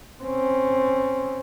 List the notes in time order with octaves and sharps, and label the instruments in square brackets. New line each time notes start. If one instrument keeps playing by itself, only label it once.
[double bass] C4 C#4